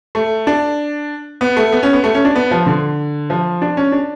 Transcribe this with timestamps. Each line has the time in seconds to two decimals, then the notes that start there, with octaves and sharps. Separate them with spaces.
0.15 A3
0.47 D4
1.41 B3
1.57 A3
1.72 B3
1.83 C#4
1.93 B3
2.04 A3
2.15 C#4
2.25 D4
2.35 B3
2.51 F3
2.66 D3
3.30 F3
3.62 D4
3.77 C#4
3.92 D4